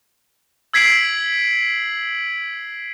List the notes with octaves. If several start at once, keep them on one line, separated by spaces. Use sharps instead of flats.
E6 G#6 B6 C7 D7 F#7